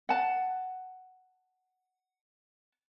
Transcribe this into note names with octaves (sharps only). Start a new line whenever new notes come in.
F#5 A5